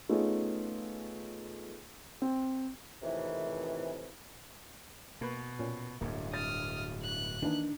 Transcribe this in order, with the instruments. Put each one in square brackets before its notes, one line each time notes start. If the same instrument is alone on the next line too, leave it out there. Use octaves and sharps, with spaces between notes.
[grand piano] A3 B3 C#4 D#4 F4 G#4
C4
[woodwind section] F2 A2 C3 D#3 E3
[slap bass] B2 [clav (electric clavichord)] A#3 B4
[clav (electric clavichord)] A#2 C#4
[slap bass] D1 G2 [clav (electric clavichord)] A#3
[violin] D#6 F6 [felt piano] A6
[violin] F#6
[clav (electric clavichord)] D#3 E3 A#3 [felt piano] D4 D#4